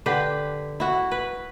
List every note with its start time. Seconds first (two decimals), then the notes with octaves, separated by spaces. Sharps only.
0.06 D3 G4 B4
0.80 E4 F#4
1.11 B4